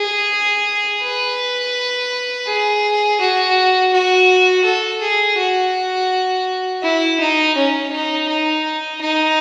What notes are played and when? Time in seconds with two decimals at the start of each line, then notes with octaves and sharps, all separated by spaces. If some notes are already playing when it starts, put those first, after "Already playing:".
Already playing: G#4
1.02 B4
2.47 G#4
3.20 F#4
3.93 F#4
4.65 A4
5.02 G#4
5.38 F#4
6.83 E4
7.20 D#4
7.56 C#4
7.91 D#4
8.29 D#4
9.01 D#4